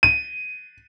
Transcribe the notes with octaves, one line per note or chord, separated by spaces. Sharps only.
D#7